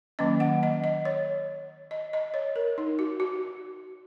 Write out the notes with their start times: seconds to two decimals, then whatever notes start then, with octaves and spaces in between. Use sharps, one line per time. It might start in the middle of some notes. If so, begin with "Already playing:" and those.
0.19 D#3 F#3 A#3 C#4 D#5
0.40 F#5
0.63 D#5
0.84 D#5
1.05 C#5
1.91 D#5
2.13 D#5
2.34 C#5
2.56 A#4
2.78 D#4
2.99 F#4
3.20 F#4